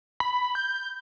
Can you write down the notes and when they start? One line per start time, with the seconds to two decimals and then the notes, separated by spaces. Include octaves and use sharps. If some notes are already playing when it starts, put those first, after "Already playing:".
0.20 B5
0.55 G6